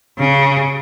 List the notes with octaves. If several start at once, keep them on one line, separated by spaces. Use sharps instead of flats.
C#3